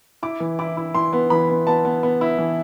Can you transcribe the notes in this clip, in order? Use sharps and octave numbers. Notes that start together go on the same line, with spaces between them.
E4 D6
E3
E4 D6
E4
E3 C6
B3
E3 B5
B3
B3 A5
B3
B3
E4
E3